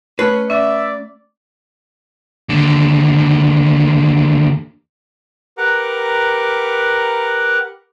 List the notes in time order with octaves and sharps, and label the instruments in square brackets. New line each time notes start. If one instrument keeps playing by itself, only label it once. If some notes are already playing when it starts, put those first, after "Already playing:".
[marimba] A3 A5 B5 [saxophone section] C#4 [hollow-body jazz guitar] B4
[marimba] C#4 [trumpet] D5 [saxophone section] E5
[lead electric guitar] D#2 D3
[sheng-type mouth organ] G4 A#4 B4 F#5 A#5 D6